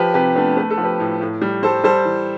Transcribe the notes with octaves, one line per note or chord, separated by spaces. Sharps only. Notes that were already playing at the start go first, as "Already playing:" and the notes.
Already playing: F3 G4 B4
C3 G4 B4
A3 B3 D4
A3 B4
A4
F3
G4 B4
A2
A2
G3
G3 A4 C5
G3 A4 C5
E3